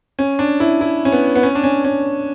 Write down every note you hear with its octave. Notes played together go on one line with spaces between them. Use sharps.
C#4
D4
E4
E4
C#4
B3
B3
C#4
D4
C#4
C#4